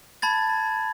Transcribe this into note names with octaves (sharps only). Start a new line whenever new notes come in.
A5 B5 G#6 A6